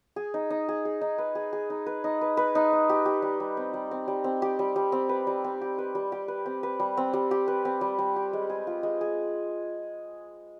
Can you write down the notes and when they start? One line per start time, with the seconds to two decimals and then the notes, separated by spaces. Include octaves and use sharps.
0.16 G#4
0.34 D#4
0.50 D#4
0.69 G#4
0.85 G#4
1.01 D#4
1.18 B4
1.35 G#4
1.53 G#4
1.70 D#4
1.86 B4
2.04 D#4
2.21 B4
2.37 B4
2.55 D#4
2.72 D#4
2.89 G4
3.06 G4
3.22 G3
3.40 G3
3.57 C4
3.74 G3
3.91 C4
4.08 G3
4.24 C4
4.42 G4
4.59 G3
4.76 G3
4.92 C4
5.09 B4
5.27 G3
5.44 C4
5.61 G4
5.78 B4
5.95 G3
6.12 G4
6.28 B4
6.46 C4
6.63 B4
6.80 G3
6.97 C4
7.13 G3
7.31 G4
7.48 B4
7.65 C4
7.81 G3
7.99 G3
8.16 G4
8.33 G#3
8.50 G#4
8.67 F4
8.83 G#3
9.01 G#4